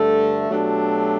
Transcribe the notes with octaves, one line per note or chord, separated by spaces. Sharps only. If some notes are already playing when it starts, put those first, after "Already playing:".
Already playing: G2 D3 A3
B2 F#3 A3 D4 G4